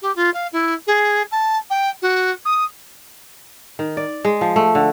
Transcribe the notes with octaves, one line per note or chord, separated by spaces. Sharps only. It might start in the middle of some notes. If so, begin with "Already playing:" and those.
G4
F4
F5
E4
G#4
A5
G5
F#4
D#6
D#3
D5
G#3
F3
A3
D3